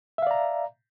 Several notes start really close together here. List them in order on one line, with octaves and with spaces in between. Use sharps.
E5 F5 D5 A#5